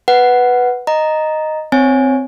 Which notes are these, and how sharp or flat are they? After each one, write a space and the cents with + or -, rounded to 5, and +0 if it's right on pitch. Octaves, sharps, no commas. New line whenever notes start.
B4 +0 F#5 +0
D#5 -5 A#5 +0
C4 -10 C#5 +0 G#5 +0